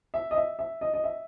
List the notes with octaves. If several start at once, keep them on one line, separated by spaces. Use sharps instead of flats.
E5
D#5
E5
E5
D#5
D#5
E5